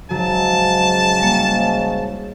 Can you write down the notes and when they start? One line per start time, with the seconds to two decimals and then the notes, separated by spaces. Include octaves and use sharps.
0.11 G#2 C#3 F#3 A5
1.19 G3 A#3